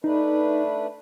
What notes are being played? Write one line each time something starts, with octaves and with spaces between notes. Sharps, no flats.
A3 D4 D#4 B4